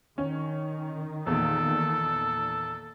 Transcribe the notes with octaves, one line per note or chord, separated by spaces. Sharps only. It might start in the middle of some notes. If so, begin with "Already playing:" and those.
D#3 C#4
E2 A#2 A4